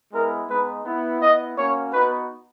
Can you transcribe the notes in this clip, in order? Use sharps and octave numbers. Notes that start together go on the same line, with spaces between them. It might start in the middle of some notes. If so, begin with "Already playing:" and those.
G#3 B3 E4 A#4
G#3 B3 D#4 B4
B3 E4
B3 E4 D#5
A#3 C#4 F#4 C#5
B3 D#4 F#4 B4